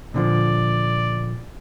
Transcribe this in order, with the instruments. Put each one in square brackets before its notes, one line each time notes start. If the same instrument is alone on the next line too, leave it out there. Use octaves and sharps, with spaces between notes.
[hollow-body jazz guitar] A#2 D3 F3 [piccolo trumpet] D5